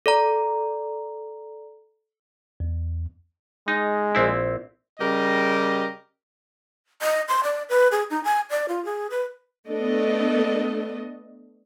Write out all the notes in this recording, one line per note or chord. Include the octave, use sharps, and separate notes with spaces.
A4 D5 A#5
E2
G#3 D#4
A#1 C4 E4
C#3 G3 G4 A#4 D#5
D#5
C6
D5
B4
G#4
D#4
G#5
D5
F4
G#4
B4
A3 B3 D4 A4 D#5